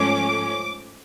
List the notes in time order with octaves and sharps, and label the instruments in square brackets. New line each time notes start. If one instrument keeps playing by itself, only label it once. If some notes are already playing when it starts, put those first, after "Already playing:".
Already playing: [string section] G#2 F3 A3 C#4 D6